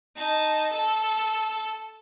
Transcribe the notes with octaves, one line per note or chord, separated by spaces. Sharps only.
D#4 A5
A4